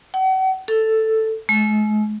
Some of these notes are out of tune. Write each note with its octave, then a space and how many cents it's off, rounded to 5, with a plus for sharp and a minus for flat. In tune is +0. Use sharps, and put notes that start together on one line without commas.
F#5 +40
A4 +5
G#3 +40